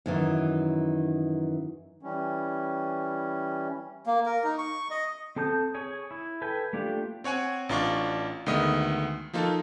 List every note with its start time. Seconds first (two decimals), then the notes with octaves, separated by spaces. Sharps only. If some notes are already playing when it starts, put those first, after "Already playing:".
0.06 F#2 D#3 E3
2.02 E3 G3 C#4
4.06 A#3
4.26 A#4
4.44 D#4
4.58 C#6
4.91 D#5
5.36 C4 A4 A5 D#6 G6
5.75 G#4 C#5 G#5
6.11 E4
6.42 A4 B4 G5 G#5
6.73 A3 A#3 D4 F4 G4
7.24 C4 C#5 F#5 G#5
7.69 A1 D4 F4 D5 F5 C#6
8.46 D2 D#3 G#3 B3 D#5 D#6
9.33 F3 A#3 D#4 F4 A4